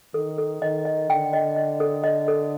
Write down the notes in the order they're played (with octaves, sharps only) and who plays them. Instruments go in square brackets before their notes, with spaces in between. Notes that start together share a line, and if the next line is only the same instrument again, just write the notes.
[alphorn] D#3 [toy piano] A4
[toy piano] A4
[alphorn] D#3 [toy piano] D#5
[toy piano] D#5
[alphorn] D3 [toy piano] G5
[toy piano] D#5
D#5
A4
D#5
A4